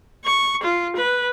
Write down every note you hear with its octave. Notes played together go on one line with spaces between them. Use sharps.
C#6
F4
B4